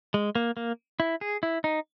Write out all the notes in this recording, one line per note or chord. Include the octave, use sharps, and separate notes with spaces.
G#3
A#3
A#3
E4
G#4
E4
D#4